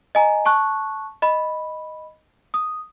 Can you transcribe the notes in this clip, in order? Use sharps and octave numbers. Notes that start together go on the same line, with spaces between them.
D#5 G#5 A#5
A5 C#6 F#6
D#5 B5
D#6